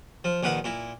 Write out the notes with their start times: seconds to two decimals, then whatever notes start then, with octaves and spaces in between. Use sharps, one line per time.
0.24 F3
0.43 A#1 D#3 B4 F#5 B5
0.64 A#2 E4